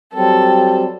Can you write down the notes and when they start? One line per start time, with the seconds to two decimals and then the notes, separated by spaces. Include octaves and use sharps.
0.14 F#3 G3 C4 A4